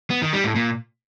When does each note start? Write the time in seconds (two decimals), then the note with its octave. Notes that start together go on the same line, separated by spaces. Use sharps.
0.10 B3
0.22 D#3
0.33 G3
0.44 A2
0.56 A#2